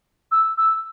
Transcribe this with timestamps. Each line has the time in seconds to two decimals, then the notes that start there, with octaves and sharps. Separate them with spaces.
0.32 E6
0.58 E6